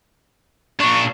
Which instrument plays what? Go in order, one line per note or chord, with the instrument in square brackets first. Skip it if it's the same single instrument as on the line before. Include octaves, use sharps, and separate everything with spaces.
[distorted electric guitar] A#2 D4 [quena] C#6